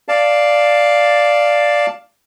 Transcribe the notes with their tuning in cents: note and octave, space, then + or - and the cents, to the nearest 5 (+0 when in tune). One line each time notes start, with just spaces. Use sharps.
D5 +0 F5 +0 A5 +5